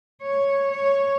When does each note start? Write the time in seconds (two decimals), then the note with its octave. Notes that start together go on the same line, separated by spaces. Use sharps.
0.22 C#5
0.71 C#5